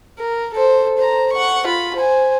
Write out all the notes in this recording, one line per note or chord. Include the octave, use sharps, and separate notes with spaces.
A#4
A4 C5
C5 A#5
F#5 C#6
F4 B5
C5 G#5